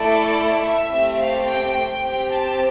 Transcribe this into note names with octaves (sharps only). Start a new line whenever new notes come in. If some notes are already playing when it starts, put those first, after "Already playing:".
Already playing: A3 E4 A4 D5
E5
A3 C4 G4
F5
G5
G5
C4 G4
A5